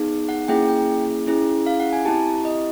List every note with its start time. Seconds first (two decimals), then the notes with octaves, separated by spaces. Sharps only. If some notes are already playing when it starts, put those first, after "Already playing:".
Already playing: B3 D#4 G#4
0.29 F#5
0.48 A#3 C#4 E4 G#4 G5
0.68 G5
1.27 C#4 E4 G#4
1.66 F5
1.80 F#5
1.93 G#5
2.05 C4 E4 G4 A5
2.45 D#5